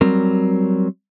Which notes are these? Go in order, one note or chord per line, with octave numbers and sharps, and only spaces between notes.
F#3 G3 C4 A#4